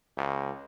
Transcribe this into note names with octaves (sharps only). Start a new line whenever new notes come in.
C#2